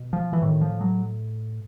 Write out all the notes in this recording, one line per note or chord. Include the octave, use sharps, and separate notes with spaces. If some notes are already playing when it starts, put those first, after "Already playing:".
Already playing: B2
F3
E3
A2 D#3
F3
F#3